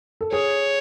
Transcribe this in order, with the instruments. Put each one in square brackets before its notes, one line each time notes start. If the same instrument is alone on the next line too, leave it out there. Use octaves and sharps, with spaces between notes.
[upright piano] A4
[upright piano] G#4 [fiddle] C#5